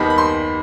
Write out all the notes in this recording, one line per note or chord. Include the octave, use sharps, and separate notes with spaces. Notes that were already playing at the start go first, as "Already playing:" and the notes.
Already playing: D#2 D#3 G3 B3 D#4 B5
B5
C6